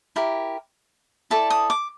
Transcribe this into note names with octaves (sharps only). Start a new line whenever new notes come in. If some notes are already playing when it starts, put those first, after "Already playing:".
E4 G4 A#4
E4 A4 D5 A5
D#6
D6